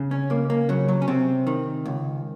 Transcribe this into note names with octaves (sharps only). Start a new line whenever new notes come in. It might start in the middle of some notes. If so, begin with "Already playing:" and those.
Already playing: C#3
C#4
C#2 A#3
A#3
C#3 F#3
F#3
C#4
C3 C4
D#3
C#2